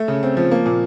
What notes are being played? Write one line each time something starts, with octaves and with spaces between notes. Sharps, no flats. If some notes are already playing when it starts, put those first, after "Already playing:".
Already playing: A3
C#3
C4
F3
A#3
A#2